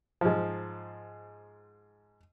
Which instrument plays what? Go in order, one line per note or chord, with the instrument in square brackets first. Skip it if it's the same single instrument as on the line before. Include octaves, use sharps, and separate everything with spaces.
[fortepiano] G#2 F3